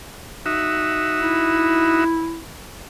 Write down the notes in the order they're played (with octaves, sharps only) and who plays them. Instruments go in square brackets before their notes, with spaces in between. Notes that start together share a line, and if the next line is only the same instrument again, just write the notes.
[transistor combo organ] D#4 F#4 E5
[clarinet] E4